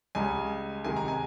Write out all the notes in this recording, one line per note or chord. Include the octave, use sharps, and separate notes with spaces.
C#2 C#3 G3 G#5
C#2 C3 D#3 G#3 G#5
A#5
G#5